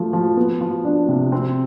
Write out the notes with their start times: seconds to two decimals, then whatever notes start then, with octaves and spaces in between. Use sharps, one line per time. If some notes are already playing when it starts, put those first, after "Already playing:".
Already playing: F3 A3
0.13 F3
0.37 B3
0.61 F3
0.85 D4
1.08 C3
1.32 C4